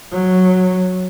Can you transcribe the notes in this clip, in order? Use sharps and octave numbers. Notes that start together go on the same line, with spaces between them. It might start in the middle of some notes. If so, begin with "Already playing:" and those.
F#3